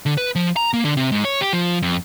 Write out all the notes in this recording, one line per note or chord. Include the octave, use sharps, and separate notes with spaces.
D3
B4
F3
A#5
A#3
D3
C3
G#2
C#5
G4
F3
F2